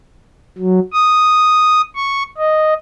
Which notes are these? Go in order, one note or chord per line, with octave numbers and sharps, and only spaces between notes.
F#3
D#6
C#6
D#5